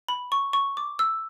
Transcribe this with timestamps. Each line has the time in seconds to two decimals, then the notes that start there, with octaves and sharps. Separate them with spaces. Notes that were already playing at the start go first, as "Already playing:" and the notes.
0.08 B5
0.32 C#6
0.53 C#6
0.77 D6
0.99 E6